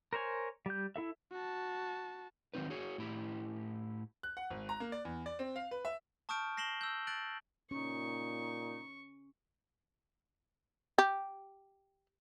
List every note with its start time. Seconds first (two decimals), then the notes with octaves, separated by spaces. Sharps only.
0.13 A#4 C5 C#5 G#5
0.66 G3 G6
0.96 E4 A4 E5
1.32 F#4 A5
2.54 D#3 F#3 C4 D#4 B4
2.70 F#4 G#4 C#5
2.98 A2 E4 G4
4.23 F#6
4.37 F#5
4.50 G#1
4.69 A#5
4.80 A#3
4.92 D5
5.05 E2
5.26 D5
5.39 C4
5.56 F5
5.71 B4
5.85 E5
6.29 A5 C#6 D#6 F6 G6 D7
6.57 A#6 C7 E7 F#7 G7
6.81 E6 G6
7.07 F#6 A6 D7 F#7
7.71 A#2 C#4 D#4 C#6
10.98 G4